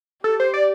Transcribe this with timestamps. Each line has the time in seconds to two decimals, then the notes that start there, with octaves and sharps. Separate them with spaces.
0.24 G4 A4
0.40 C5
0.54 D5